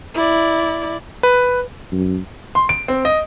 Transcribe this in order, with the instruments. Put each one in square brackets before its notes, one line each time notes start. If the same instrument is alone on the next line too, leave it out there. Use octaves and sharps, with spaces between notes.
[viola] E4 D5
[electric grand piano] B4
[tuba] F#2
[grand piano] C6
D7
C4
D#5